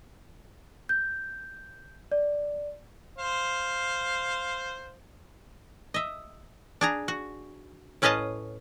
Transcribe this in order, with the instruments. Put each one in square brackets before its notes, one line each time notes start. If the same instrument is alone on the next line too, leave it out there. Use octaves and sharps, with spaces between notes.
[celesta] G6
D5
[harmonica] C5 F5
[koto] D#5 E5
D4 G#4 A#5
F#4
A2 C#4 B4 D#5 F5 A5